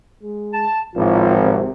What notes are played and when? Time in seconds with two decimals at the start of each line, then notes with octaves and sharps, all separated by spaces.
0.23 G#3
0.53 A5
0.95 G#1 E2 A2 F3 F4
1.43 C3